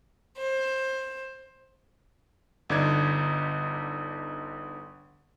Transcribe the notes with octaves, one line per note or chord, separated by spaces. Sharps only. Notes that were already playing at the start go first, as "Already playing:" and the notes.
C5
G1 D3 D4 D#4 G#6